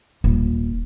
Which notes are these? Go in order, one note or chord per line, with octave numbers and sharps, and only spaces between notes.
D#1